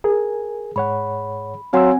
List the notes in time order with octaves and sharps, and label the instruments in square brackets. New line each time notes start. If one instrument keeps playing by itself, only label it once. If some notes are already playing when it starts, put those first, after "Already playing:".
[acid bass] G#4 [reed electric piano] A#4 G#5
[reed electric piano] G#2 C#5 F#5 [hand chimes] B5
[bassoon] F#3 [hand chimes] C4 F#5 G#5 [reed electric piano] F5 C6 E6